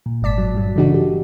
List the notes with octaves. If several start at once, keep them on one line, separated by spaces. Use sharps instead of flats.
A#2
G1 G#2 D5 A5 B6
F#3
G2 F#3
C#3 E3 A3 D4 D#4 F#4
G4